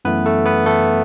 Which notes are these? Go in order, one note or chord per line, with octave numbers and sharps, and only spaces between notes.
F#2 E3 A3 B3 B4
A3 A4
B3 B4
A3 A4